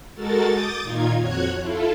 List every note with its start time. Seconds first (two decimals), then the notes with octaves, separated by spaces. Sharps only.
0.14 G#3 F#4 A4 A#4 A6
0.45 D6 D#6 G6 A6
0.83 A#2 D#3 D#4 F4 G#6
1.19 F2 F#4 C#5 F#6 G#6
1.59 E4 F4 A4